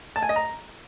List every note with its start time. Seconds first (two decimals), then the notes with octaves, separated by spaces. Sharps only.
0.16 A5
0.23 G#5
0.29 D#5
0.36 A#5